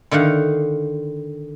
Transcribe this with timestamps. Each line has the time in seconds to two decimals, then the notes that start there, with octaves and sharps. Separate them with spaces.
0.11 D3 D#3 F5 F#5